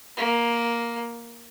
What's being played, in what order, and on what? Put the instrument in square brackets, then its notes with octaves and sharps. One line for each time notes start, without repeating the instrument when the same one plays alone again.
[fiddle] A#3